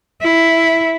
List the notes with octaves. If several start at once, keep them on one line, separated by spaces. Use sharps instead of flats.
E4